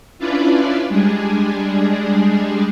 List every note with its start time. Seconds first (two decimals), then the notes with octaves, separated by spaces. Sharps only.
0.19 C#4 D4 E4 F4 B4 D5
0.89 G3 G#3 D4 G#4